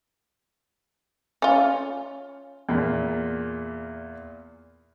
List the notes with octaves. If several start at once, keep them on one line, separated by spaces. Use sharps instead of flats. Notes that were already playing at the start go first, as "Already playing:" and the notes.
C#4 F4
E2 A#2